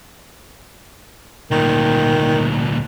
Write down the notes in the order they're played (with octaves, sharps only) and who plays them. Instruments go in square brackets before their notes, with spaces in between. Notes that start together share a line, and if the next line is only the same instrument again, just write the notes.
[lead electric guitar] D2 A#2 [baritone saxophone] D#3